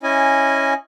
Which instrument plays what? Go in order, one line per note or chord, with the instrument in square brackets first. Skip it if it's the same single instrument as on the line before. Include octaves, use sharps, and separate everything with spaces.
[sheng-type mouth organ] C#4 E4 D#5 G#5